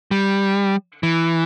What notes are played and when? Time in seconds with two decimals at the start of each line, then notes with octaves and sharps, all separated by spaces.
0.11 G3
1.03 E3